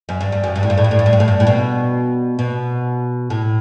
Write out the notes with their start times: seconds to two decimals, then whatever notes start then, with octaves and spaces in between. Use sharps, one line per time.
0.09 F#2
0.21 G2
0.32 G2
0.44 F#2
0.56 G2
0.63 A2
0.70 G2
0.77 A2
0.84 G2
0.91 A2
0.99 G2
1.06 A2
1.13 G2
1.20 A2
1.28 G2
1.40 A2
1.47 B2
2.39 B2
3.30 A2